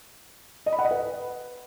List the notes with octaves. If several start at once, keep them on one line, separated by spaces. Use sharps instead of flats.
D#5
B5
F#5
D#5
B4